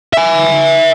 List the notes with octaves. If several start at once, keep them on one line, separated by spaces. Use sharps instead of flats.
E5 G#5